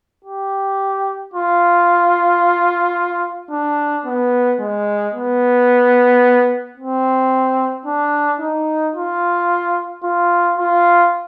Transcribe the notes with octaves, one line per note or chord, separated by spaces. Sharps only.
G4
F4
D4
B3
G#3
B3
C4
D4
D#4
F4
F4
F4